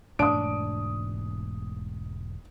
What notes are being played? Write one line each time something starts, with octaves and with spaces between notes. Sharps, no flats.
E1 G#2 A3 D4 D#6 D7